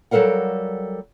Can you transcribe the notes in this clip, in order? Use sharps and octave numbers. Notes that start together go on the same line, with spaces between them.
F#3 G3 A4 A#4 F5 F#5